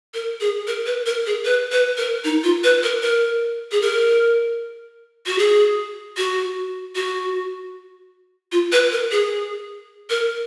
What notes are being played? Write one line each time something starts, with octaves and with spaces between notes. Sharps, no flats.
A#4
G#4
A#4
B4
A#4
G#4
B4
B4
A#4
D#4
F4
B4
A#4
A#4
G#4
A#4
F#4
G#4
F#4
F#4
F4
B4
A#4
G#4
A#4